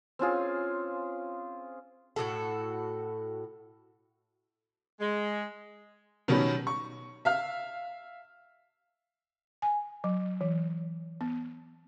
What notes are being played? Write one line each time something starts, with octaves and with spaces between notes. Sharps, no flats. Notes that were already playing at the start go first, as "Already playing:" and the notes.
C4 C#4 F4 G#4
A2 F#3 F#4 A4
G#3
B2 D#3 F#3 G3 B3 C#4
C#6
E5 F5 F6
G#5
F#3
E3
B3